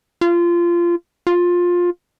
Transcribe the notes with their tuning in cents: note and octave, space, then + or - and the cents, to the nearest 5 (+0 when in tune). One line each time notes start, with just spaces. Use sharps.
F4 -20
F4 +15